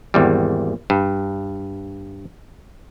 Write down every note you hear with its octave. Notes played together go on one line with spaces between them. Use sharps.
G#1 E2 G3
G2